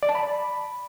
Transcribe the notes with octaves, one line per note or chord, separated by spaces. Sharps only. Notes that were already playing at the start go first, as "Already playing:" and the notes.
D5
A5
B5